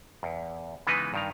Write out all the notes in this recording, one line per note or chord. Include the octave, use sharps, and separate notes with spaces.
E2
C#3 E3 G#3 B3 D#4 B4
G2 D#3 A#5